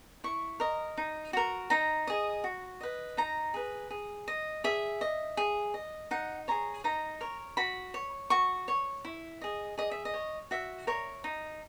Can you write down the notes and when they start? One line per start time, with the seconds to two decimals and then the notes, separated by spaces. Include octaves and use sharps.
0.24 E4 C#6
0.60 A#4 D#5
0.97 D#4
1.33 F#4 A#4
1.70 D#4 A#5
2.07 G#4 D#5
2.44 F#4
2.81 B4 D#5
3.17 D#4 A#5
3.54 G#4 B4
3.91 G#4
4.28 D#5
4.64 G#4 E5
5.01 D#5
5.37 G#4
5.74 D#5
6.11 D#4 F#5
6.48 G#4 C#5 A#5
6.84 D#4 A#5
7.21 A#4 C#5
7.57 F#4 B5
7.94 C#5
8.30 F#4 C#6
8.68 C#5
9.05 E4
9.41 G#4 D#5
9.78 G#4 D#5
9.91 E5
10.05 D#5
10.14 C#5
10.51 F#4 E5
10.87 A#4 C#5
11.24 D#4